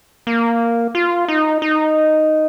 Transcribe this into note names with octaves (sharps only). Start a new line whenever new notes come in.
A#3
F4
D#4
D#4